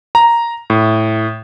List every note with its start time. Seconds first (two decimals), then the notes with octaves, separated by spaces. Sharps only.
0.15 A#5
0.70 A2